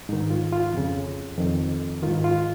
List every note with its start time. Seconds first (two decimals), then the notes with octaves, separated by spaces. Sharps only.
0.09 G#2 D#3 D#4
0.30 F4
0.53 F4
0.74 F2 C#3
1.37 F2 D#3
2.03 G#2 D#3 F4
2.24 F4